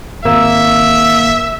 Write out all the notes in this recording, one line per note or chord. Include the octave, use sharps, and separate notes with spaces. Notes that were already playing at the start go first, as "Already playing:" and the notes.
G#1 A#3 E5 E6